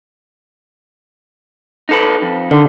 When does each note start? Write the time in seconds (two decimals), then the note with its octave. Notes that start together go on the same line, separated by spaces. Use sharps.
1.89 D#4 A4 B4
2.22 F2
2.51 D3 D#3